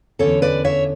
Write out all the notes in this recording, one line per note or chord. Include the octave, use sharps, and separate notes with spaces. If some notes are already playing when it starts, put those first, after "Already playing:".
E2 D3 G#3 C#4 A4 C#5
B4 D5
C#5 E5